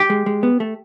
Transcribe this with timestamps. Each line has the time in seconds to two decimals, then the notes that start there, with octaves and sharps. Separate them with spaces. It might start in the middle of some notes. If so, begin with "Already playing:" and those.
Already playing: G4
0.10 G#3
0.26 G#3
0.43 B3
0.60 A3